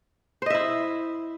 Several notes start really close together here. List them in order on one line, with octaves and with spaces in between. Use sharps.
C5 D#5 E5 E4